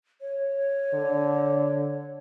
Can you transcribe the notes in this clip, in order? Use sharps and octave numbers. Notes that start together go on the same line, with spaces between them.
C#5
D3